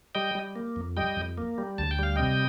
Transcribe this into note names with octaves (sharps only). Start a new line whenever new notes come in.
G3 D#5 G5
G3
A#3
F2
G3 D#5 G5
F2
A#3
G3
D2 A5
G5
G3 F5
C3 D#5 G5